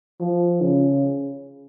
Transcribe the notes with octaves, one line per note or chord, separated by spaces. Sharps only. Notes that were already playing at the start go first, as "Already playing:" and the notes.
F3
C#3